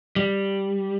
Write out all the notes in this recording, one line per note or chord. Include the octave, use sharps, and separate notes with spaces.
G3